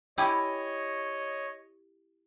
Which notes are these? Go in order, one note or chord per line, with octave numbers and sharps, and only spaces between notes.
E4 G4 C#5 D#5 G#5